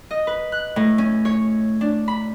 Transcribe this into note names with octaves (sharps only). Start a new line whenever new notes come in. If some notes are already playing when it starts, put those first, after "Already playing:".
D#5
B4
F#6
A2
C#4
C#5
D4
B5